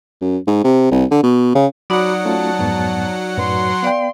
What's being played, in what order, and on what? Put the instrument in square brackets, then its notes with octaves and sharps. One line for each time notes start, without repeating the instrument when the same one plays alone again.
[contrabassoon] F#2
G#2
C3
C2
D3
B2
C#3
[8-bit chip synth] F#3 F#5 [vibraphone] D#4 D5 [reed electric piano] F#4 B5 D6
[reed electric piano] A3 C#4 F4 [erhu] A5
[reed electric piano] F2 G#2 B3
[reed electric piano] F#2 A2 B4 [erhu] C6
[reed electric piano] B3 G5 [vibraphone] D5 F5